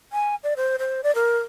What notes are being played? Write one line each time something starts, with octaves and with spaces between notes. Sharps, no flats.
G#5
D5
C5
C5
D5
A#4